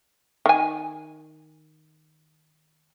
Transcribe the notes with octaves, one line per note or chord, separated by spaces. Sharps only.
D#3 G#5